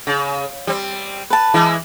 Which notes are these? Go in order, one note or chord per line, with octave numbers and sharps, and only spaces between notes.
C#3
G3 C4
B4 A5
E3 G#3 E4